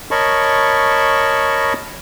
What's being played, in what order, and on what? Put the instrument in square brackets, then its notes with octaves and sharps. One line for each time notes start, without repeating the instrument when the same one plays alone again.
[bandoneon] A#4 C#5 D#5 A5 B5 C#6